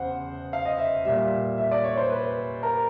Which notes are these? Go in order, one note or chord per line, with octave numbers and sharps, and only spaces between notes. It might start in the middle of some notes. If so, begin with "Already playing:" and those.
Already playing: E2 C#3 C5 F#5
F5
D#5
E5
A#2 G3 E5
E5
D5
C#5
C5
B4
A#4